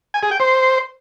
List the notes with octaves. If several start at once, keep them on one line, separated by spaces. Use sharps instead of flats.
G#5
G#4
G5
C5